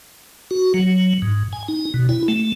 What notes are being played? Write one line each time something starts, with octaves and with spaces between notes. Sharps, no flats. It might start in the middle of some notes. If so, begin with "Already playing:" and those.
F#4
F#3
G#2
G#5
D#4
B2
E4
A3